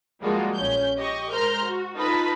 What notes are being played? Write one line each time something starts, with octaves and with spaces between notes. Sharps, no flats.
F3 G3 G#3 A#3 F4 F#4
A#1 C#4 G6
G4 D#5 C#6
G#3 A#4 C5 A#5 F6 G6
F#4
D#4 F4 A4 B4 A5 B5